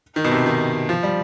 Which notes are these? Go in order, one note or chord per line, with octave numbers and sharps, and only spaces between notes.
D#3
B2
C3
D#3
F3
G3